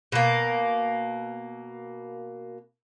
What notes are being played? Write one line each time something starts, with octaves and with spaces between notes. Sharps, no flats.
B2 A#3